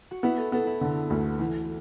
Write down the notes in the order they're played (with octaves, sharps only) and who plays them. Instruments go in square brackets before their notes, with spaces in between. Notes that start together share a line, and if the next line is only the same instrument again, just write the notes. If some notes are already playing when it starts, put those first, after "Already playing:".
[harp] F#4
[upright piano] B3 [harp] E4
[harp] A4
[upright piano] B3 [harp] A4
[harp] E4
[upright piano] D3
D2
E3